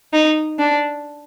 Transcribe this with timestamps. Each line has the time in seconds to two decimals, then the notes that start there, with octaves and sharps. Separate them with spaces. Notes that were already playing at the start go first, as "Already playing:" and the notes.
0.13 D#4
0.59 D4